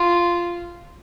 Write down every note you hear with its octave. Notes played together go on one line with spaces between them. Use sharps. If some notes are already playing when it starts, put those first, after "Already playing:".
Already playing: F4